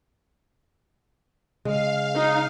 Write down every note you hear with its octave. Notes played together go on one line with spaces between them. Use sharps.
C#3 G#3 F5
D#4